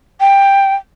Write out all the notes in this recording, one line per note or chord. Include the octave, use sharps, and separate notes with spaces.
G5